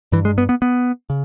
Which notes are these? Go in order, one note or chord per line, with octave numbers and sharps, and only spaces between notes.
G2 E3
G#3
B3
B3
B3
C#3